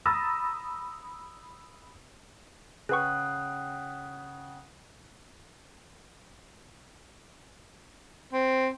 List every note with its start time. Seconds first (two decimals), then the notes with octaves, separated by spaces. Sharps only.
0.06 A#5 B5 D#6 E6 A6 A#6
2.89 C#3 G#4 B4 F#5 G5 C#6 D#6 F#6
8.33 C4